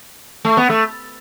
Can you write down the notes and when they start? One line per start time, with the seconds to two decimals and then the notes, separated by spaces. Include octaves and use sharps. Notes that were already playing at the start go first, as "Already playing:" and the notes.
0.45 A3
0.57 B3
0.70 A3